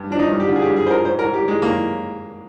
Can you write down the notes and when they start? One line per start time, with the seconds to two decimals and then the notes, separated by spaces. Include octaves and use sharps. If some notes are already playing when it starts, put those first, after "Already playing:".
Already playing: G2
0.10 F3 D4
0.19 D#4
0.29 G2
0.40 G4
0.48 D3 F4
0.56 G#4
0.62 G4
0.66 G2
0.76 G#4
0.86 F3 C5
0.90 A#4
1.05 G#2 C5
1.19 A#4
1.24 G#2
1.33 G4
1.43 D#3 G#3
1.62 D#3 A#3